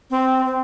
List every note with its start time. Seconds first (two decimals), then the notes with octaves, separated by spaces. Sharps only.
0.10 C4
0.45 C4